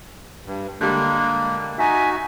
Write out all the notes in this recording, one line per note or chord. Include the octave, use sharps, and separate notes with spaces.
G2
D3 G3 G#3 A#3
D#4 F#4 E5 G#5